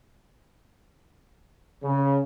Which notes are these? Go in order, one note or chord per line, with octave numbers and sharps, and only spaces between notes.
C#3